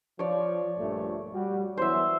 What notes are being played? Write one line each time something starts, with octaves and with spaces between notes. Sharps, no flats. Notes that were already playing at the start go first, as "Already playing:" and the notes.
F3 C#5 D5
A#1 G2 A3
G3 F#4
E2 E3 F#3 C5 E5